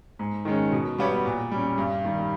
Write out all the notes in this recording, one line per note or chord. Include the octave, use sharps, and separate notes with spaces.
G#2
D#3 G#3 C#4
B2
G3 B3 G4 C#5
A#2
G3 C#4
G2
D#3 G3